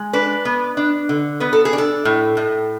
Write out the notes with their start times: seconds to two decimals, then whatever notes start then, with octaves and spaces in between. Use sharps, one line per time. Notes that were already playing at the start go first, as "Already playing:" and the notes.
Already playing: G#3
0.13 D4 B4
0.45 B3
0.77 D4
1.09 D3
1.40 B3 B4
1.53 A4
1.65 G#4
1.73 D4
1.78 A4
2.05 A2
2.37 A2